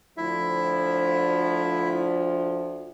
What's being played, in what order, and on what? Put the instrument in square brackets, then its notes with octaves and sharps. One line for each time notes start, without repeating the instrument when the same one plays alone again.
[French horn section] D2 F3 [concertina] E4 E5